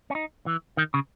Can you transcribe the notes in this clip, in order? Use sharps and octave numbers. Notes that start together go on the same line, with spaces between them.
C#4
D#4
E3
D#3
C#3